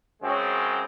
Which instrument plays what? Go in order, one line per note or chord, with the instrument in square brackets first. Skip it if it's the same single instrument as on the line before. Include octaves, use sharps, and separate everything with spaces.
[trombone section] F#2 C#3 G#3 C4 F#4